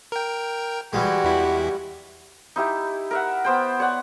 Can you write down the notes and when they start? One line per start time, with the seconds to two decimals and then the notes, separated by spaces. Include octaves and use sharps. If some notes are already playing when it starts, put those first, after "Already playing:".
0.12 A#4 G5
0.93 E3 G3 G#3 F#4 G4
1.24 E2 E4
2.56 D#4 E4 G4
3.11 A#4 E5 F#5
3.45 B3 C5 G5
3.80 C#5 D5 F#5